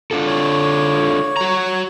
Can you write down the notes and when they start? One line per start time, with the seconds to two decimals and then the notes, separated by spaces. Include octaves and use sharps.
0.11 D4 F4 A4
0.27 C#5
1.37 F#4 A#5